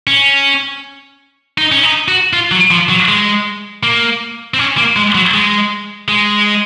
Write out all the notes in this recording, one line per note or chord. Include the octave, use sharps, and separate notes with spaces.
C#4
D#4
C#4
D#4
F#4
F4
F#3
F3
F#3
G#3
A#3
C4
C#4
A#3
G#3
F#3
G#3
G#3